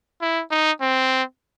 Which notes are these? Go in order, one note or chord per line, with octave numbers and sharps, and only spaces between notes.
E4
D#4
C4